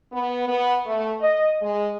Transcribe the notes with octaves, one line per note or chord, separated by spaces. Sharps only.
B3
B3
A3
D#5
G#3